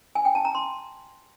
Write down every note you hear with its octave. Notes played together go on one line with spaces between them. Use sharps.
G#5
G5
A5
A#5
C6